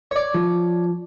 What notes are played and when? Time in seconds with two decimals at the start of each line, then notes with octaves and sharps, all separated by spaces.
0.11 C#5 D5
0.34 F3